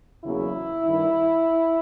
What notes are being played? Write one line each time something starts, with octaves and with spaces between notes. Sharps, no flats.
E2 C#3 F#3 A#3 E4
G2 D#3 G3